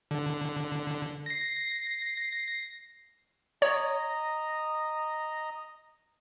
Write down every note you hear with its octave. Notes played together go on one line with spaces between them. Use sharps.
D3
A#6 C7
C#5 D#5 A#5